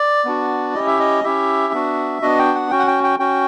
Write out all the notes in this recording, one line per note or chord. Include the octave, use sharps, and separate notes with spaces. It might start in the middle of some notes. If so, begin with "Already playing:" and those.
Already playing: D5
B3 D4 F#4
C#4 E4 G4 D#5
E5
D#5
C#4 E4 G4 E5
B3 D4 F#4
B3 D4 F#4 D#5
G5
F#5
C#4 F#4 G5
F#5
G5
G5
C#4 F#4 G5